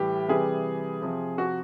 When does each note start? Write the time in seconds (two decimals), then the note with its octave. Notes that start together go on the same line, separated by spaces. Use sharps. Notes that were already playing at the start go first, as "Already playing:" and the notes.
Already playing: A2 E3 G3 G4
0.28 C3 E3 G3 G#4
1.02 C3 F3
1.38 F#4